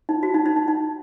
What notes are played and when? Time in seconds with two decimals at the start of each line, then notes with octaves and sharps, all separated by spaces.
0.09 D#4
0.23 F#4
0.34 D#4
0.46 D#4
0.56 D#4
0.68 D#4